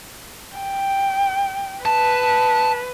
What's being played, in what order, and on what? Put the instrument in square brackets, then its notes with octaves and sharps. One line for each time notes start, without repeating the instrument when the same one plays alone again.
[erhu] G5
[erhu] B4 [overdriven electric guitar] A5